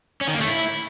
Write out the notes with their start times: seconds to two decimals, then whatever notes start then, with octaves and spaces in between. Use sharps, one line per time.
0.21 C#4
0.28 D#3
0.34 A#3
0.41 A3
0.47 E4